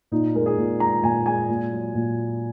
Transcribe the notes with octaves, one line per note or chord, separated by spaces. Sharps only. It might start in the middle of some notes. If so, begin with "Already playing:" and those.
A#2 D#4
G#3 A#4
G#4
A#2
G#3 A#5
A#2 G#5
G#3 G#5
A#2
F#3
A#2